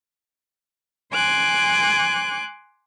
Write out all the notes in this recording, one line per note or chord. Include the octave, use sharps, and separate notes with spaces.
G#5 C6 D6 F#6